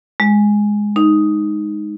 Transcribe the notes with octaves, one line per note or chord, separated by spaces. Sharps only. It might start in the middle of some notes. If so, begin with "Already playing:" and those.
G#3
D#4